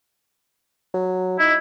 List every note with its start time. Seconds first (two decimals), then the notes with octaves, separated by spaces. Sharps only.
0.94 F#3
1.39 D#4 E4